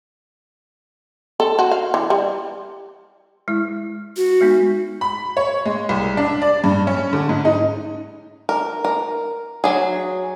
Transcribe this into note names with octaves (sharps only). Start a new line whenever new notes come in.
A4
F#4
F5
E3
G3
G#3 E4
F#4
G#3 B3 D#4
B5
C#5
G#3
C2
D4
D5
G2
C#4
D3
G#2
D#4
A#4
A#4
F#3 G#4